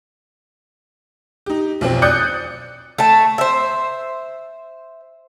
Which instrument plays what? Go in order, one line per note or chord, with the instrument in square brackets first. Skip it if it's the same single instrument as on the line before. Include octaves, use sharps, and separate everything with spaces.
[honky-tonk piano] D#4 G4
B1 F2 C4
D5 D#6 F#6 G6 C#7
[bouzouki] A3 A5
C5 E5